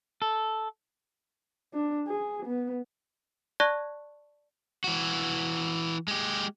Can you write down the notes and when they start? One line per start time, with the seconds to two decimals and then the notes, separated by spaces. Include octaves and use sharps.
0.22 A4
1.74 D4
2.07 G#4
2.46 B3
3.60 D5 A5 C#6 F#6 G#6 A#6
4.84 E3 F#4
6.08 G#3 G4